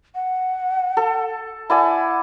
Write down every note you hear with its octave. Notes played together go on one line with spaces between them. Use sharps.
F#5
A4
E4 D5 F#5 G#5